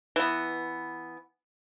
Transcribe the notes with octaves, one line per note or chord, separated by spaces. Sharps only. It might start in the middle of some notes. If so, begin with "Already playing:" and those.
E3 B3